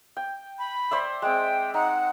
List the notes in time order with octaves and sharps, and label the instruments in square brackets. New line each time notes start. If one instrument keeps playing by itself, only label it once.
[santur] G5
[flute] B5
[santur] C5 D5 E5
[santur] G#3 C4 [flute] G5
[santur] D#4 [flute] F#5